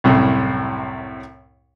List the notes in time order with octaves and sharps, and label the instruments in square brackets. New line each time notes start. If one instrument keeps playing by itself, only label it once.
[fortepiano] C2 F#2 A2 C3